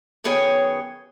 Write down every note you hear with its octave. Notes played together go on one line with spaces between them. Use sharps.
F#2 D#3 B3 G#4 C#5 G5